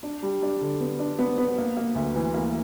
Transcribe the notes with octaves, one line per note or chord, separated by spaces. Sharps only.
D4
G3
D4
D3
B3
D4
B3
B3
A#3
A#3
D2
E3
A#3